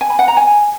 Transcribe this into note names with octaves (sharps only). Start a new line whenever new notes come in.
G#5
B5
F#5
A#5
G#5